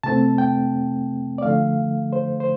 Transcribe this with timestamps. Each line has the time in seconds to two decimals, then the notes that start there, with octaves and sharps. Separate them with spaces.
0.04 C3 A3 C4 A5
0.38 G5
1.38 D5
1.43 D3 F3 A3 F5
2.13 C5
2.40 C5